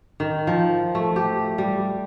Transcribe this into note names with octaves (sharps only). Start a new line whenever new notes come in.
D#3
F3
A3
G4
G3